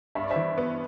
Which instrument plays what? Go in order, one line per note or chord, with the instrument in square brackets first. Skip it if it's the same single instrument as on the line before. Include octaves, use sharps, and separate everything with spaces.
[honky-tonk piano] G2 [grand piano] E5
[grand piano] D5
C5 E5
[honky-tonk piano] E3
B3